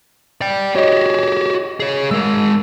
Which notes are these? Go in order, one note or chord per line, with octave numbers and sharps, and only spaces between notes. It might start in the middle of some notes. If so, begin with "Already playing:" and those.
D5 G5
F#4 G4 C#5 D#5
G#4 C#5
G#3 A#4 E6